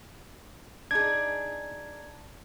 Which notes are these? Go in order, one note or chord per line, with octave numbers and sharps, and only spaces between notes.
D4 D#4 G#4 G#6